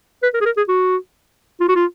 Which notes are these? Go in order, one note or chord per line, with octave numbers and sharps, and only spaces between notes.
B4
A#4
G#4
A#4
G#4
F#4
F4
F#4
F4